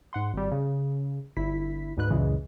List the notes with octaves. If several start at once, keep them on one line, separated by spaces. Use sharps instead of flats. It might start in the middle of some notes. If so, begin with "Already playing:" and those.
G#2 F#5 C6
G#1 G3
C#3
G1 E4 B6
D2 G#2 B4 F#6
C#2 F#2 A#2 C#3 E3 G#3